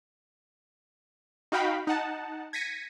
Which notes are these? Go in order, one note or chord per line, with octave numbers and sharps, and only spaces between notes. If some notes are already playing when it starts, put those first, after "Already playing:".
D#4 F#4 F5 G5 B5
D#4 F#5 A5
G#6 A#6 B6 C#7 D#7